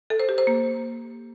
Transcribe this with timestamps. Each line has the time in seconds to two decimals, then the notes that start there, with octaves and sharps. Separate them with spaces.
0.10 A4
0.20 C5
0.29 G4
0.38 C5
0.47 A#3